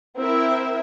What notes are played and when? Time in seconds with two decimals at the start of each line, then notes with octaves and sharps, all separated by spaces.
0.17 C4 E4 A#4 E5